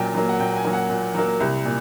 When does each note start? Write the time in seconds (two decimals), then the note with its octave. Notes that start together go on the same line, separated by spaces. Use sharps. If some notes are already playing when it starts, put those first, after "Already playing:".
Already playing: A#2 F#3 A#3 G5 G#5
0.15 F#3 A#3
0.29 F#5
0.40 A#2 G5
0.52 G5
0.56 G#5
0.64 F#3 A#3
0.73 F#5
0.90 A#2
1.14 F#3 A#3
1.40 C2
1.65 A#2